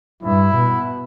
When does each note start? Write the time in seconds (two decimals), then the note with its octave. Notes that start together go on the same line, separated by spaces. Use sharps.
0.23 G2 E4
0.55 B2